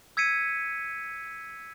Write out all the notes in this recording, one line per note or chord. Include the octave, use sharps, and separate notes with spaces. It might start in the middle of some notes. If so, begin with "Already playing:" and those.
E6 G#6 B6 C#7 D#7